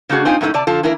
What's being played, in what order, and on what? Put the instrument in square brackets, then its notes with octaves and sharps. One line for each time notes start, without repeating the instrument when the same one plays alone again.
[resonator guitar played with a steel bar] C#3 A3 D4 F#4 G#4
C4 D#4 F4 G#5
F#2 A#2 A3 A#3 D#4 E4
C3 D5 A5
D3 F3 F4 A4
E3 A#3 E4 A#4